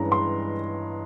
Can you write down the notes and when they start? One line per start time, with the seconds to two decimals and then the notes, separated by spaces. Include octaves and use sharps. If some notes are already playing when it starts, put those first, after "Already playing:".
Already playing: G2 E3 G#3 C#4 A#5
0.12 C6